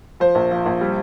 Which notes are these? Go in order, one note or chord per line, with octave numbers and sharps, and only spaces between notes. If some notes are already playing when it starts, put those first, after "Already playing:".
F3 C5
A#1
F3
A#1
G3